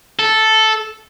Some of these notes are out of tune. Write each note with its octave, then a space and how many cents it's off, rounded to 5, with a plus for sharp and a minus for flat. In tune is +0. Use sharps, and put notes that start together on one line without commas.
A4 -5